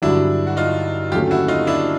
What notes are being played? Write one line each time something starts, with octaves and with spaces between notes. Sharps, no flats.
G2 D3 F#3 D4 E4
F#4
D#4 F4
D#2 D3 F#3 A3 C#4 F4 G4
E4 F#4
D#4 F4
D4 E4